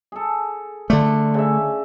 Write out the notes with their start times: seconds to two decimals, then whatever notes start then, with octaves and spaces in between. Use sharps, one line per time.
0.12 G#4 A4
0.90 D3 A3 D4 F4
1.34 C#3 E5